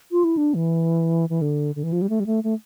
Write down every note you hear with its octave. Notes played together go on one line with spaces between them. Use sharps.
F4
E4
D4
E3
E3
D3
D3
E3
F3
G3
A3
G3
A3
A3